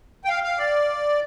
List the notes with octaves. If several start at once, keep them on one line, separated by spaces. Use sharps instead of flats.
G5
F5
F5
D5